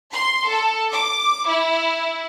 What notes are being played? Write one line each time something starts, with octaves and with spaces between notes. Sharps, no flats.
C6
A4
D6
E4